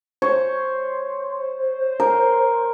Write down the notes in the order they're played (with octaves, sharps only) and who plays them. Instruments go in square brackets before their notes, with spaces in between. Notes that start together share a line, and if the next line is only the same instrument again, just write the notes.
[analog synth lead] C5 [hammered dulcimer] C#5
[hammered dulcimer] A#4